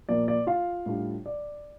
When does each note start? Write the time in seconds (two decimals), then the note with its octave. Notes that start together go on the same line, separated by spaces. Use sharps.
0.09 A#2 F3 A#3 D5
0.28 D5
0.47 F4 F5
0.86 A2 G3 D4 F4
1.26 D5